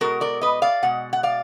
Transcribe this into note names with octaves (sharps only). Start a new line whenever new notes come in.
B2 G#3 B3 F#4 A#4
A#4 D5
B4 D#5
D5 F5
B2 G#3 F#5
F#5
D5 F5